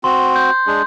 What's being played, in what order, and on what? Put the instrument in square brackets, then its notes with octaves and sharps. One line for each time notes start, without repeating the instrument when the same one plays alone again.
[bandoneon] C4 F#4 [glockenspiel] C6
[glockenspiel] G6
[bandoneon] G#3 D4 G#4